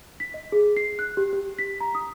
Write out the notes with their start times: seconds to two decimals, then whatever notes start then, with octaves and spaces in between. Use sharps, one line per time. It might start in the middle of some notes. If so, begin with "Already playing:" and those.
0.20 B6
0.34 D#5
0.52 G#4
0.77 C7
0.99 F#6
1.17 G4
1.33 G4
1.59 B6
1.81 A#5
1.95 D#6